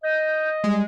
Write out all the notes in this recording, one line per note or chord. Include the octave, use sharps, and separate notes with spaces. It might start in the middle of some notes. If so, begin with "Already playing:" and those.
D#5 G6
G3 G#3